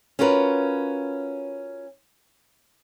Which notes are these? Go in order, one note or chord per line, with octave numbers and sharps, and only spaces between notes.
C#4 F4 F#4 A#4 B4